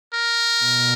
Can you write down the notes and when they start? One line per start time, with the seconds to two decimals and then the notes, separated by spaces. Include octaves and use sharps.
0.13 A#4
0.62 B2